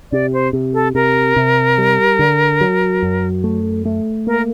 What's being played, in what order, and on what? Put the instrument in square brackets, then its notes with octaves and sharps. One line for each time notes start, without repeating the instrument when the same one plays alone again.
[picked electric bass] C3 [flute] D5
[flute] C5
[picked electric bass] C3
[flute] A4
[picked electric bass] C3 [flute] A#4
[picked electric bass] C3
G3
D3
F#3
F#2
A3
A3
[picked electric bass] A#3 [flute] A#4